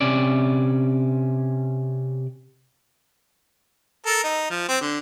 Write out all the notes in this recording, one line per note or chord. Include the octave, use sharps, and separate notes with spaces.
C3 C#4 D5
A4 A#4
D#4
F3
C4
D3